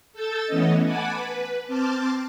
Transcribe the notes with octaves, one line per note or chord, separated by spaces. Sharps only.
A4 E6 G6 A6
E3 A3 B3 C#4 D#5
F#5 G#5 A5 B5 D6
B4
C4 A5 C6 D6 F6